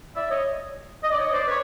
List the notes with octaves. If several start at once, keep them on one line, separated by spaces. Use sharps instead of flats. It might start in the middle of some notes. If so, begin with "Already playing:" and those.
D5 E5
C#5 D#5
D#5
D5
C#5 D#5
C5 D5
B4 C#5